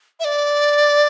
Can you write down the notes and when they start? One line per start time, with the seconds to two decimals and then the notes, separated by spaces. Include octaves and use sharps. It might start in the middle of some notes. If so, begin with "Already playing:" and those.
0.20 E5
0.24 D5